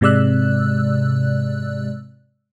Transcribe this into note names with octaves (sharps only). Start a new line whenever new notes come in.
G#2 C3 G#3 D5 E6 F#6